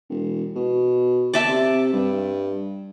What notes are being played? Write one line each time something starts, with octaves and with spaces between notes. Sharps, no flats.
E1
B2
D5 E5 A5
C3
G2